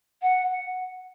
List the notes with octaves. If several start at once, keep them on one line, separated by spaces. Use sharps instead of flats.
F#5